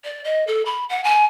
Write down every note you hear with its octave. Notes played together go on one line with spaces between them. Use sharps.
D5
D#5
A4
B5
F#5
G#5